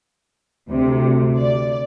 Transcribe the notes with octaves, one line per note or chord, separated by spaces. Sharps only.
D2 C3
D5